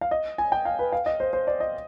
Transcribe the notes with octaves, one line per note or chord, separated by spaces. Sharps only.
F5
D#5
G#5
G5
F5
B4
F5
D#5
C5
C5
D5
D#5